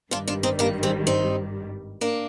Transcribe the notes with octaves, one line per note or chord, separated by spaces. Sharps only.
G#1 G2 D#3 G3 D4 F4
D4 F4
C4 D#4
A#3 D4
G#3 C4
C4 D#4
A#3 D4